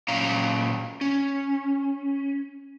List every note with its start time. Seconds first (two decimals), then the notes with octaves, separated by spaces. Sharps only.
0.08 A#2 F#3 C#4 D5 F5 A#5
1.01 C#4